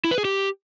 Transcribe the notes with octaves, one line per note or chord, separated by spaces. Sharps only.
E4
B4
G#4
G4